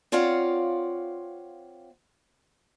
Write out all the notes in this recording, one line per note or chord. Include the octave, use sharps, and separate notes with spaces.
C4 F4 C#5 D5 F5 F#5